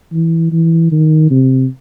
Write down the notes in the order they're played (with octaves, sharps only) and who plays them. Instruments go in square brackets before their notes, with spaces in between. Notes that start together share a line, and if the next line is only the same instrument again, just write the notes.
[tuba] E3
E3
D#3
C3